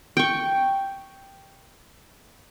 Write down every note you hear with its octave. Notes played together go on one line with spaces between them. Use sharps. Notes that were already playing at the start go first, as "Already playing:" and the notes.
G5 C#6